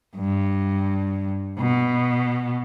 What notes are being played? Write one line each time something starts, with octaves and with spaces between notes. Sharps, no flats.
G2
B2